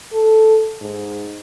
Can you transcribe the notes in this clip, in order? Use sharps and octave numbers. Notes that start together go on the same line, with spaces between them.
A4
G#2